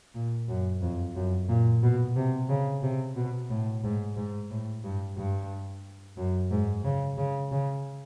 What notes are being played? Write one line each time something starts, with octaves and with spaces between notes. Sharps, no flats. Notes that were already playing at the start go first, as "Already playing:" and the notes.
A#2
F#2
F2
F#2
A#2
B2
C3
C#3
C3
B2
A2
G#2
G#2
A2
G2
G2
F#2
G#2
C#3
C#3
C#3